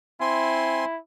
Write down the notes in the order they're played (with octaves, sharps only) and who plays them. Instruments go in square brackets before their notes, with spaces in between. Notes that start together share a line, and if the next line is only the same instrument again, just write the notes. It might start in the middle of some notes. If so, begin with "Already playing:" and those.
[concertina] C4 G#5 C6 [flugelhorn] E4